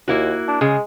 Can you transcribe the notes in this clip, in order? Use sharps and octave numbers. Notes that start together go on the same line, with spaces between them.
D#2 A#3 E4 F#4
D4
C#3 G#3 G#4